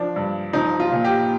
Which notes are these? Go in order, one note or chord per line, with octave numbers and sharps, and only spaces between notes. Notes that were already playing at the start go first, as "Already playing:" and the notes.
Already playing: F3 D4
G2
F3 D#4
F4
A#2
G4